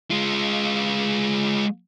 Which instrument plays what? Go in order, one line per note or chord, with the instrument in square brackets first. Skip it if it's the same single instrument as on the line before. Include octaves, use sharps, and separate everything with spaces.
[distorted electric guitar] G#3 F4